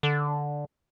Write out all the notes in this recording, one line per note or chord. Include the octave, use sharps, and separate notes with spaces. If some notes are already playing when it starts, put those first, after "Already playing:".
D3